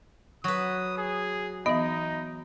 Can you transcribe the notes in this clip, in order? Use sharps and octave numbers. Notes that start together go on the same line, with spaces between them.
F#3 B4 C#6 D#6
G#4
E3 B3 D#4 D#5